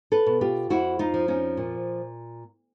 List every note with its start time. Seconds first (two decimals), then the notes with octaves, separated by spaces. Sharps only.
0.12 A4 B4
0.26 B2
0.41 F4 G4
0.70 F2 E4 F#4
0.99 D#4 F4
1.14 F3
1.28 C#4 D#4
1.57 A#2